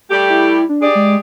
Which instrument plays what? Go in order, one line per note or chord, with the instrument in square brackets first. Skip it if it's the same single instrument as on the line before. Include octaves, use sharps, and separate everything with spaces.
[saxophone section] G3 A3 G4
[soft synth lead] E4
D4
[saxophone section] G4 G#4 D5
[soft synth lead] G#3